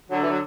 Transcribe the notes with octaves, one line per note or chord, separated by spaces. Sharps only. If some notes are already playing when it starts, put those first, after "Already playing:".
D3 F#3
E3
F#3